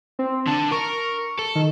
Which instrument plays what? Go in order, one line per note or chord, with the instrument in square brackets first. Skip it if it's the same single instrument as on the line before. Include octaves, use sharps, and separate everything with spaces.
[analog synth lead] C4
[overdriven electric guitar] D3 D4 [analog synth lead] A5
[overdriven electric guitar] A#4 [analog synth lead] C#6
[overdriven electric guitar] A4
[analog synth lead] D#3